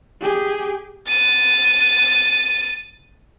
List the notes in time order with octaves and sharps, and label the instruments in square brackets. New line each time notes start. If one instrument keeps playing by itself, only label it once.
[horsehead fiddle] G4 G#4
[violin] A6 D#7